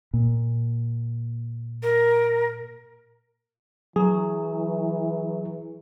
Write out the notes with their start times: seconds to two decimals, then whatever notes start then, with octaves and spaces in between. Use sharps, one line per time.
0.14 A#2
1.83 A#4
3.96 E3 F#3 G#4